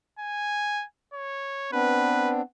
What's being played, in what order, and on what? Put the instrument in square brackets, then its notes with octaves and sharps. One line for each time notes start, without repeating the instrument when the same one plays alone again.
[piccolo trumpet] G#5
C#5
[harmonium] B3 C4 D4 [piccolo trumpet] B4